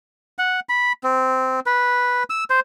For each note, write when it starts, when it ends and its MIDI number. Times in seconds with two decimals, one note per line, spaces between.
0.39 0.60 78
0.69 0.93 83
1.04 1.60 60
1.66 2.23 71
2.30 2.44 88
2.50 2.60 72